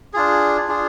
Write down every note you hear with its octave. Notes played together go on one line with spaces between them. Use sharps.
D4 F4 G#4
D4 F4 G#4